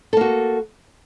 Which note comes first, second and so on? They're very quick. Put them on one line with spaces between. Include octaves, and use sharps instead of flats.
A4 A#3 F#4